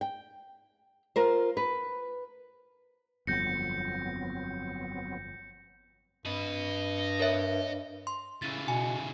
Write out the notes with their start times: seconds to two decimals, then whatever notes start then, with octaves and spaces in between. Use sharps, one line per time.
0.01 G5
1.16 F4 A#4 C5
1.57 B4
3.27 G1 F2 F#3 B3 C4 G6 A#6 C#7
6.26 G2 D#5 B5
7.20 A#4 C#5 E5
8.07 C6
8.42 C#3 E3 A6
8.68 B2 G#5